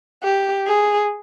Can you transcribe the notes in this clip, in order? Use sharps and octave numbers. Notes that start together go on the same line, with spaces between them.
G4
G#4